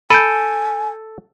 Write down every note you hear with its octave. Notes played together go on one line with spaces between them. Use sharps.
A4 G#5 B5 G6 D7 D#7